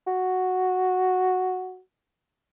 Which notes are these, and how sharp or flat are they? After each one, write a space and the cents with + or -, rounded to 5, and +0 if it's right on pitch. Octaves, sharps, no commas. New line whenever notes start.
F#4 -5